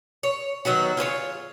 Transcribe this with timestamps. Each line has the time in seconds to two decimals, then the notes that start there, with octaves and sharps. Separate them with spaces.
0.23 C#5
0.65 D#3 F#3 B3 F#4
0.97 F4 G#4 C5 C#5